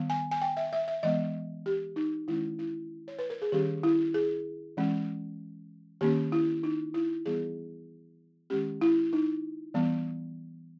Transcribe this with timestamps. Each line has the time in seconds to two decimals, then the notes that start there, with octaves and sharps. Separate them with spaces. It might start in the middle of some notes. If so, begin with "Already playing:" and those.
Already playing: D#3 G3 B3
0.10 G#5
0.31 G#5
0.42 G5
0.57 E5
0.73 E5
0.88 E5
1.03 E3 G#3 B3 D#5
1.66 G4
1.96 D#4
2.28 D#3 G#3 C#4 E4
2.59 E4
3.08 C#5
3.19 B4
3.30 A#4
3.42 G#4
3.52 D#3 G3 C#4 G4
3.83 E4
4.14 G#4
4.77 E3 G#3 C#4
6.01 D#3 A#3 C#4 G4
6.32 E4
6.63 D#4
6.94 E4
7.26 E3 G3 B3 G#4
8.50 D#3 G#3 C#4 G4
8.81 E4
9.13 D#4
9.74 E3 G3 B3